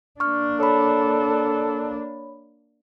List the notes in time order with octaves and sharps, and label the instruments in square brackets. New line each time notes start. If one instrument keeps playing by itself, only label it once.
[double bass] A#3 D4 [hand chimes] C#6 F6
[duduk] A4 [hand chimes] C#5 B5